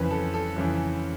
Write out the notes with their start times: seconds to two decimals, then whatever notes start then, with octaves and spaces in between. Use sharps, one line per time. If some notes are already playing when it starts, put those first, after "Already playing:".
Already playing: F2 C#3 E3 B4
0.11 A4
0.34 A4
0.56 F2 C#3 E3